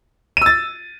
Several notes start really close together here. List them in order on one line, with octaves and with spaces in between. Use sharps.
D#7 E6 A6